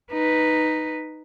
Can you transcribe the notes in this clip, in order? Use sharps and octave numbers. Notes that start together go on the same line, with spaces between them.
D#4 B4